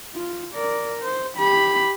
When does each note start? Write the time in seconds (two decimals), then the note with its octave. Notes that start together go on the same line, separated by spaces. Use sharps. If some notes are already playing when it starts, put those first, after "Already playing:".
0.15 F4
0.54 A#4 D5
1.03 C5
1.38 G4 B5